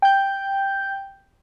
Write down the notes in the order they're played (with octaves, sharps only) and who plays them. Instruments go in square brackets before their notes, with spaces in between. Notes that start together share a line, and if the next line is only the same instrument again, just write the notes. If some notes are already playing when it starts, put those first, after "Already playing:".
[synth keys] G5 G6